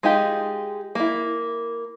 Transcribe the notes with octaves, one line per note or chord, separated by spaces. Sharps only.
G#3 D#4 F4 G4
A#3 E4